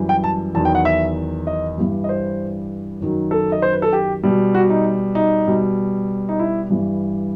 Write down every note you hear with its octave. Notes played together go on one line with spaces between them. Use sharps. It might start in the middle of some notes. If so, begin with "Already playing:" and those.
Already playing: F#2 E3 G3
G5
A5
E2 D#3 F#3 A5
G5
F#5
E5
D#5
G2 E3 G3
D#5
C5
F#2 D#3 F#3
A4
D#5
C5
B4
A4
G4
B2 G3
F#4
D#4
D#4
B2 G3
D#4
E4
G2 E3 G3